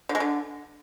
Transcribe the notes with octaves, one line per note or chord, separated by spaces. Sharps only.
D3
G#3
D3